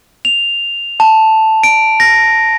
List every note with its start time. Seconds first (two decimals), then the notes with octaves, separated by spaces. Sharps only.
0.25 F7
1.00 A5
1.63 D7
2.00 A#6